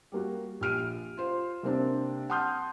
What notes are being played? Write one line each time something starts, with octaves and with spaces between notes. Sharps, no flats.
G3 A#3 F#4
A#1 G4 F6 D7 D#7
F4 C5
C3 A#3 C4 D4
F#5 A5 C6 D#6 F6 G6